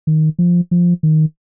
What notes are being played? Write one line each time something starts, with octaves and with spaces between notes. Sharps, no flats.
D#3
F3
F3
D#3